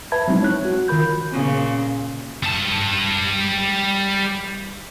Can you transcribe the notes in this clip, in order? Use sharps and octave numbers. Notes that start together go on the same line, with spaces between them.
B4 E5 A5 B5 G#6
F#3 G#3 C4 D#4 E4
C#5 F#6
F#4
D#3 F4 A#4 B5 G6
A#2 C#3
G3 A5